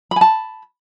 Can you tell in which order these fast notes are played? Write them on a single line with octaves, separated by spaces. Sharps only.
B5 G#5 A5